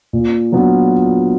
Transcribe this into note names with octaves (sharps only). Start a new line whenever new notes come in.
A#2
F#3 B3 D4 F4